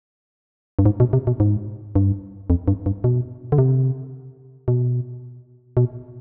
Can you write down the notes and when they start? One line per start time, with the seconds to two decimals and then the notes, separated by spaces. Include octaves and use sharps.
0.79 G2
0.86 G#2
1.00 B2
1.13 C3
1.27 B2
1.40 G#2
1.95 G2
2.50 F2
2.68 G2
2.86 G2
3.04 B2
3.52 D3
3.58 C3
4.68 B2
5.77 B2